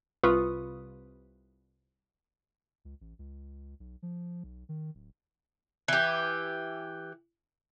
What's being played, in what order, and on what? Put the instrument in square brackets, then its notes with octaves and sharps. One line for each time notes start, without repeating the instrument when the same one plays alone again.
[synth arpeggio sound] C2 F4 B4 C#6 D#6
[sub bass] C#2
A1
C#2
B1
F3
B1
D#3
D1
[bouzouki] E3 G4